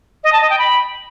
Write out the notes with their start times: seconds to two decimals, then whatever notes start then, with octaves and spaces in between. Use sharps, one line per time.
0.24 D#5
0.32 A5
0.41 D#5
0.50 G5
0.59 B5